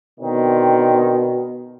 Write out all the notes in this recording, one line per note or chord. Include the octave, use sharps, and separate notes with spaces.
B2 D3 D#3 C4